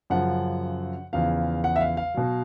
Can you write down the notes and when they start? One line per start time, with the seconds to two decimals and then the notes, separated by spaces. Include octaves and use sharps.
0.10 F#2 C#3 F3 F#5
1.13 E2 C#3 F3 F5
1.64 F#5
1.76 E5
1.81 F5
1.97 F5
2.14 B2 F#3